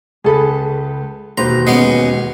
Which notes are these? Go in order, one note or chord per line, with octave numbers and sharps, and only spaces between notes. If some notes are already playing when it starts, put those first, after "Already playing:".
C#2 G#4 A4 B4
E1 D#2 B4 C5 A#5
G#3 B3 C#4